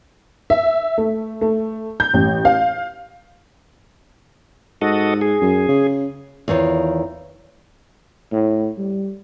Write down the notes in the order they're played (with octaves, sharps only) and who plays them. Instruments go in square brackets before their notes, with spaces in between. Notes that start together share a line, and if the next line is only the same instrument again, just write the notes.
[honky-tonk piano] E5
A3
A3
G6
A1
F5
[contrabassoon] G#2 [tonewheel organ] F#4 A4 D#5
[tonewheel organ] G#4
[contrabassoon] F#2
C#3
[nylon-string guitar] E2 D#3 F4 C#5
[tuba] A2
G3